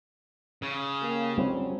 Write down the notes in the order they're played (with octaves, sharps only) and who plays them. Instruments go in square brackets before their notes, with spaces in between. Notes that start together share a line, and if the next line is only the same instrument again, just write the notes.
[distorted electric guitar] C#3
[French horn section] A#3 G4
[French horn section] F2 F#3 C#4 [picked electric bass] G3 C4